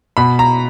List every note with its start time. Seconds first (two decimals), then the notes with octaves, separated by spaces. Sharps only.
0.17 B2 B5
0.39 A#5